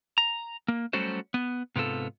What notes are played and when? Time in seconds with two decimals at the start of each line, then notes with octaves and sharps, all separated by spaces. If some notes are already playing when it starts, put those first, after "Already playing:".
0.18 A#5
0.68 A#3
0.93 F#3 G3 A3 C#4 F#4 C5
1.34 B3
1.76 G#2 C3 B3 F4 A4